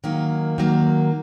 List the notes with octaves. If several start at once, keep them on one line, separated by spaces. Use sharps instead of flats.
D#3 F#3 A#3
D#3 F#3 A#3